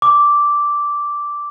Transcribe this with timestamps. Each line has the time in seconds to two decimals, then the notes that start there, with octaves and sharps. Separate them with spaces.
0.02 D6